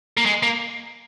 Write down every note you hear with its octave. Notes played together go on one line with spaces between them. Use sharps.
A#3
G#3
A#3